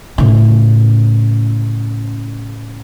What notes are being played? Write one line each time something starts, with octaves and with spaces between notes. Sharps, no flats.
A2 C#3